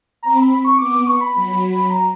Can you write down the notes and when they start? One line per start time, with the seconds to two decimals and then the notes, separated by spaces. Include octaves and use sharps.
0.23 C4 A#5
0.37 B5
0.51 B5
0.65 C#6
0.78 B3 D6
0.93 D6
1.07 C#6
1.21 B5
1.34 F#3
1.90 A#5